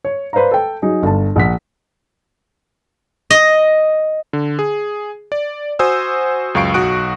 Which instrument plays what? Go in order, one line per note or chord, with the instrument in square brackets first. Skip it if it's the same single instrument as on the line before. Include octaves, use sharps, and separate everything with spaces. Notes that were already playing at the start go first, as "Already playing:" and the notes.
[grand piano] C#5
B4 C5 D5 F5 A#5
A4 G5
F#3 D#4 F#4 G#4
G1 A5
A#1 F#5 B6
[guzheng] D#5
[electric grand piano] D3
G#4
D5
F#4 C5 G#5 D#6 E6
C#2 F#2 F5 C#6 C7 D7
B1 F#4 C#6 D#6 F#6 D7